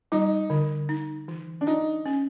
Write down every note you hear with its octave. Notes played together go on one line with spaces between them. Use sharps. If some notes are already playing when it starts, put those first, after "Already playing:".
G3 D#4
D3
D#4
E3
D4
D#4 D5
C#4